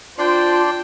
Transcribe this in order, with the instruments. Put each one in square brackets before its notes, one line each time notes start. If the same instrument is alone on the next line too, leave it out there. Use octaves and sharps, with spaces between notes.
[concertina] D4 D5 C6 [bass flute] F4 [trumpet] C5 [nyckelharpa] G5 A5